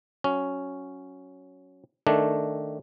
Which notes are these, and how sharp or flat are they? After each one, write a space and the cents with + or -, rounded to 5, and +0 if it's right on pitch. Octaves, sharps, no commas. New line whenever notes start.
F#3 +0 C#4 +0
D#3 -10 A3 +0 D4 +0